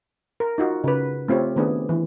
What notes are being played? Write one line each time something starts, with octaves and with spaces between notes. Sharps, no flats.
A#4
D#4 F4 F#4
C#3 B4
A3 C4 F4 G4 C#5
D#3 A3 B3 D4 G#4
E3